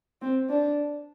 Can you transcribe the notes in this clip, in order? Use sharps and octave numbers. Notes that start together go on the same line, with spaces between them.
C4
D4